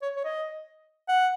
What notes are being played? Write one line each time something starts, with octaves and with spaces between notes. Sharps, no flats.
C#5
C#5
D#5
F#5